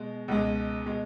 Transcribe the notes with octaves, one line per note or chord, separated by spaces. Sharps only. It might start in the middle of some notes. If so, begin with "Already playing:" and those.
Already playing: B2 G#3
C#2 B2 G#3
B2 G#3